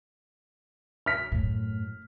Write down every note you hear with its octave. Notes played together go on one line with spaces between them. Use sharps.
F6 B6
F#2 A2